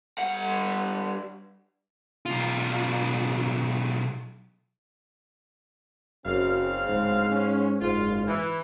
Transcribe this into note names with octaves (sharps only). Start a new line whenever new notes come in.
G2 F#5
B1 F4
F#1 F#2 C#3 C4 F5
D1 G#2
C#4
F#1 G#2 F4
E3